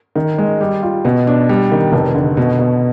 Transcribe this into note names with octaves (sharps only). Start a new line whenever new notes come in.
D#3
G#3
G3
F4
B2
D4
G3
D#3
F1
D3
B2
B2